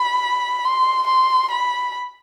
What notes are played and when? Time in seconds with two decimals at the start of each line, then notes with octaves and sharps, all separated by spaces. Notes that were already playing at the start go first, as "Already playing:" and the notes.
Already playing: B5
0.65 C6
1.07 C6
1.51 B5